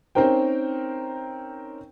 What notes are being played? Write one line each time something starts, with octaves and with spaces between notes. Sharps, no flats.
C4 C#4 D#4 A#4 C5 G5